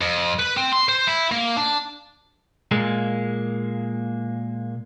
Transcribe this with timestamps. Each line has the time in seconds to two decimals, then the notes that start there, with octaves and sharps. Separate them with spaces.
0.01 F2
0.39 B4
0.57 C4
0.73 C6
0.89 C5
1.07 E4
1.32 A#3
1.57 D4
2.71 A#2 G#3 A#3